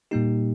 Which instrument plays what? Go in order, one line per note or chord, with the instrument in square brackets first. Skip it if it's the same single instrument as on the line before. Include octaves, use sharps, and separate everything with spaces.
[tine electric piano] A#2 G3 A#3 D#4 G4